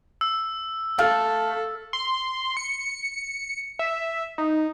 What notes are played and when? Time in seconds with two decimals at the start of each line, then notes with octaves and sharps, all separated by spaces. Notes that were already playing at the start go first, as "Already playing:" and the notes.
0.21 E6
0.99 A3 A4 F5 F6
1.93 C6
2.57 C#7
3.79 E5
4.38 D#4